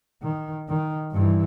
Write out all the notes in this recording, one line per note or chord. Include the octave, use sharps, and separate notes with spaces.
D#3
D#3
G2 E3